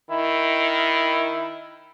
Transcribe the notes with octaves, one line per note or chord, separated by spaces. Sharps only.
D#3 E4